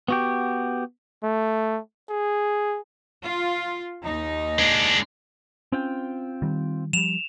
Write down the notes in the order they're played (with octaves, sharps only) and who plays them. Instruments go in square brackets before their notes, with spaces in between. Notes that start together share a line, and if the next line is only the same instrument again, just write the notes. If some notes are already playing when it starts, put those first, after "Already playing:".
[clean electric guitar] B3 F#4 G4
[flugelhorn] A3
G#4
[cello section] F4
D#2 D#4
[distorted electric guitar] G#3 D4
[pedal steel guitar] C4 F4 G5 [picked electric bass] C#4
[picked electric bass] D#3 G3
[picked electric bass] F3 G3 [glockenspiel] E7 F7